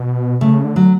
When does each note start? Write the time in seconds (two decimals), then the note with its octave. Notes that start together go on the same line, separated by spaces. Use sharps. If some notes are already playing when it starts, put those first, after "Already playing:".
Already playing: B2
0.41 C#3 A3
0.64 D3
0.76 F#3